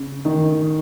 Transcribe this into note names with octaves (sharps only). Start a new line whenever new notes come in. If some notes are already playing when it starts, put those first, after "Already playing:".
Already playing: C#3
D#3